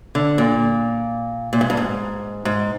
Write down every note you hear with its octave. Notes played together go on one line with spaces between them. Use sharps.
D3
A#2
A#2
G#2
G2
G#2
G#2